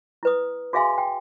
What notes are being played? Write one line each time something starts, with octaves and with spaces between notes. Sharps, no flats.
E4 B4 D#6
F#4 G#4 E5 F5 G#5 C6
G5